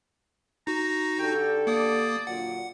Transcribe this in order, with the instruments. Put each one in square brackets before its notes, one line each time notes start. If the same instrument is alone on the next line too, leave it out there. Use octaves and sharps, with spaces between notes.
[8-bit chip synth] D#4 F#4 [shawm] A#5
[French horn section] D3 G4 A4 [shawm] G5
[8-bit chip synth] A#3 D#6 [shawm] D5
[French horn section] A#2 D3 F#3 [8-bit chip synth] F#5